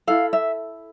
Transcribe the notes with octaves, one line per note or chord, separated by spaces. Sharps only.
E4 A4 F5
E5